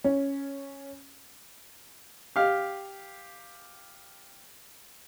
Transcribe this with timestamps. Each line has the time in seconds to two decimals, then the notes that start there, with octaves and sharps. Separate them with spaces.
0.04 C#4
2.36 G4 F5